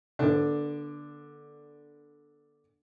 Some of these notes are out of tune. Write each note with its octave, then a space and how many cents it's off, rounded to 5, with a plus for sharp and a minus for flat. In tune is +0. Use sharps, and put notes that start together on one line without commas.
D3 +0 B3 -40 D4 +0